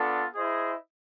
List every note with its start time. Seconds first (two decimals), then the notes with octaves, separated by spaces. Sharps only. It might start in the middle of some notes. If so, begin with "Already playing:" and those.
Already playing: B3 D4 F4 A4
0.35 E4 G#4 C5 D#5